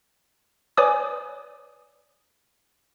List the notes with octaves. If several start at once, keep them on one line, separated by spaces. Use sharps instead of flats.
B4 C#5 D5 G#5 D6 D#6